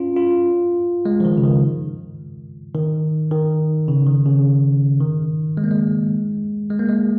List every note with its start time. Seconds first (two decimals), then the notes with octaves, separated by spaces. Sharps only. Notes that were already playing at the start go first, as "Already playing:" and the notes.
Already playing: C#4 F4
0.16 F4
1.05 G#3
1.20 F3
1.25 D#3
1.37 C#3
1.43 D#3
2.75 D#3
3.31 D#3
3.88 C#3
4.06 D#3
4.26 C#3
5.01 D#3
5.57 G#3
5.64 A#3
5.71 G#3
6.70 G#3
6.79 A#3
6.88 G#3